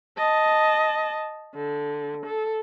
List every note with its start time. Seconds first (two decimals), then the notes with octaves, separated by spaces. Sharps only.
0.18 D#5 A5
1.55 D3
2.26 A4